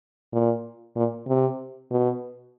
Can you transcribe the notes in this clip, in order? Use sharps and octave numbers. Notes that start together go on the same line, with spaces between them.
A#2
A#2
C3
B2